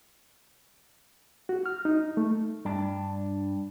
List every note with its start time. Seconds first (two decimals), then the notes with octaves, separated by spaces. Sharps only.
1.49 F#4
1.66 F6
1.85 D#4
2.17 A3
2.65 G2 D4